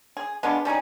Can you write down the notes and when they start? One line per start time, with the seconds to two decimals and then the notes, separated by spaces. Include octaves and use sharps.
0.17 G#4
0.43 G#3 B3 D4 F4
0.65 G3 C#4 D#4 G#4